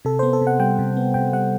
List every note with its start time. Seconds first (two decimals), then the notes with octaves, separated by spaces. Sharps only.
0.05 C3 A4
0.19 B3 C5
0.33 A4
0.42 C3
0.47 F#5
0.59 G3 G5
0.79 C3
0.97 B3
1.14 C3 G5
1.33 G3 F#5